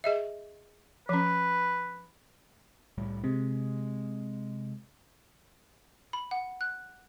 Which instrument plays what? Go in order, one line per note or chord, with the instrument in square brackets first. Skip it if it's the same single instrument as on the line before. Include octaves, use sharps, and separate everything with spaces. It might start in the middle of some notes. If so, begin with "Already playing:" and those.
[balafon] G#4 D#5 E5
[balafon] F3 C#4 [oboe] B4
[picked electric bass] C2 A2 G3
[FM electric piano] C3 [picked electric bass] G#3
[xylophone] B5
F#5
F#6